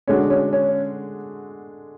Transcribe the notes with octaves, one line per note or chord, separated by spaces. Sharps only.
D3 G#3 C#4 D4 F#4
C#4
C#4